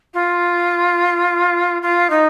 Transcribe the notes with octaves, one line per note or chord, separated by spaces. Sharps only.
F4
F4
D#4